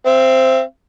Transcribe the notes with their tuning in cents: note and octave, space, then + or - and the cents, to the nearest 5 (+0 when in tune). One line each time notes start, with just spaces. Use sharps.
C4 +0 E5 +40